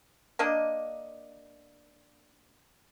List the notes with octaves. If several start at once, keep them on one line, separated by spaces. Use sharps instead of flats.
A#3 D4 D#5